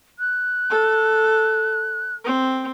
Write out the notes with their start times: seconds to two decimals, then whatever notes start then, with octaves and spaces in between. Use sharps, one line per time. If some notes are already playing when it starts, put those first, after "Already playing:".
0.19 F#6
0.70 A4
2.24 C4